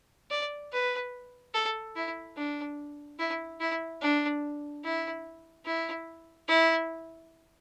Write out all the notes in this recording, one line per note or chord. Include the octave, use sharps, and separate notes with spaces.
D5
B4
A4
E4
D4
E4
E4
D4
E4
E4
E4